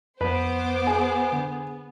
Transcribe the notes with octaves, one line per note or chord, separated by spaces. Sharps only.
F2 B3 B4 C5 D6
G#4
D3